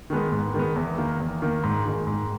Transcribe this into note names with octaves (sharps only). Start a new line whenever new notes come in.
D#3 G#3 B3
G#2
D#3 G#3 B3
E2
D#3 A#3
E2
D#3 A#3
G#2
D#3 G#3
G#2